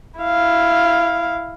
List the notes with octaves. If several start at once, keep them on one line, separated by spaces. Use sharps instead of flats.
E4 F5